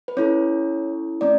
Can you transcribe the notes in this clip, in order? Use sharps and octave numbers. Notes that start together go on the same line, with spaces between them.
B4
C#4 E4 A4 C#5
A3 C#4 D5